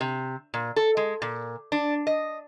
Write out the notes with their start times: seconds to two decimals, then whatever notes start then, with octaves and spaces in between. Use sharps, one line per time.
0.01 C3
0.54 A#2
0.76 A4
0.97 G#3
1.22 A#2
1.72 D4
2.07 D#5